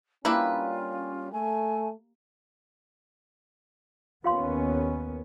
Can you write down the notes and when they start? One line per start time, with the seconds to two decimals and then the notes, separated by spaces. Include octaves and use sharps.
0.25 G3 A#3 C#4 D4 E4 F4 G4 B4
1.32 A3 G#5
4.24 D#2 B3 C#4 F4 F5 C6